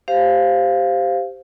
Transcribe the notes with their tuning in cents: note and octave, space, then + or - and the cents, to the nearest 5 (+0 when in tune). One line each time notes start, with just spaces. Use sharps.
G4 +0 C5 +0 F5 +0